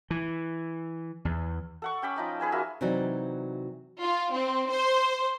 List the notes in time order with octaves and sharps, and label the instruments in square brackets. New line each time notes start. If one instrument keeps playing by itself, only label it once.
[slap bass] E3
E2
[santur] A4 F#5 C#6
C#4 G5 B5 D6
F3 D#4 D#5
G#4 B4 G#5 A5
A#3 F#4 E5 G#5
[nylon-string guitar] C3 E3 F#3 D#4 F#4 D5
[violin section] F4
C4
C5